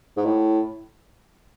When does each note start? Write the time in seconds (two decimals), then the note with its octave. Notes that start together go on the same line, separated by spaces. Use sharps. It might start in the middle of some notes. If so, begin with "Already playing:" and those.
0.17 G#2
0.25 A2